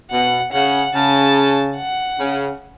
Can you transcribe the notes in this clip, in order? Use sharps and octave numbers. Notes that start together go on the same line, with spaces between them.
B2 F#5
C#3 F#5
C#3 A5
F#5
C#3